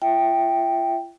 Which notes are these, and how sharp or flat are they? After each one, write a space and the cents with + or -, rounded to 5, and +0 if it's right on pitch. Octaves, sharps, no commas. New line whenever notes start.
F4 -40 E5 +0 G5 +0